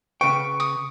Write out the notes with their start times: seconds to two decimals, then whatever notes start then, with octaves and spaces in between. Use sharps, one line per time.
0.21 C#3 B4 G5 C#6 D7
0.60 D#6